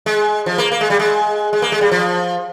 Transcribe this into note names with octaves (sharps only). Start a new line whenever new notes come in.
G#3
F3
A#3
A#3
G#3
G3
G#3
G#3
A#3
G#3
G3
F3